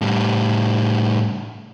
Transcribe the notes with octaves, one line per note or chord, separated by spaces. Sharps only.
A2 G3